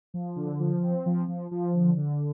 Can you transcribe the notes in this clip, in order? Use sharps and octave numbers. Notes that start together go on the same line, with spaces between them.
F3
D3
F3
C4
F3
F3
F3
D3
D3